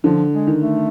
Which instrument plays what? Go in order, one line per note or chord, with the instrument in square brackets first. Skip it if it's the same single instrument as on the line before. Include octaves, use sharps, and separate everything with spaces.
[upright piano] D3 [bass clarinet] F3
[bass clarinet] G#3
[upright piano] D#3
[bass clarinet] A3